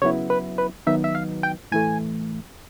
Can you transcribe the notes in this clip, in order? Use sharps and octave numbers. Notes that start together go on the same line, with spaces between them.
C#3 F#3 B3 E4 C#5
B4
B4
D#3 F#3 B3 D#4 E5
E5
F5
G5
A2 E3 A3 G#5